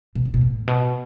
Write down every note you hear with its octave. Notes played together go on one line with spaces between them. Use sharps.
B2
C#3
B2
A2
B2